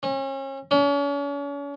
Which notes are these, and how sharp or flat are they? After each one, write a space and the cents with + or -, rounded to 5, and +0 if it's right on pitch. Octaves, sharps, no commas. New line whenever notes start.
C#4 -35
C#4 +40